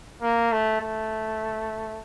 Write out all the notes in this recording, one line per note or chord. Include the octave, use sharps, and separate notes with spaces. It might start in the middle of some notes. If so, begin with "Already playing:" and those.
A#3
A3
A3